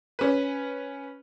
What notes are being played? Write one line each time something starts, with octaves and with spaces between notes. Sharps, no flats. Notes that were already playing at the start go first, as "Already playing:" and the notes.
C#4 B4